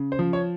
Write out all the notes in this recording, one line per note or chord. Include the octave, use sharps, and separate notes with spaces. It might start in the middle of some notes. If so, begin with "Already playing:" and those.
Already playing: C#3
C5
F3
C#5